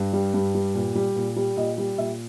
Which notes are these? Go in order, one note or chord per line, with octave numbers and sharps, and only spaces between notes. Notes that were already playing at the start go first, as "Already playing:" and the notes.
Already playing: G2
G3
G2
G3
A#2
G3
A#2
G3
A#2 D#5
G3
A#2 E5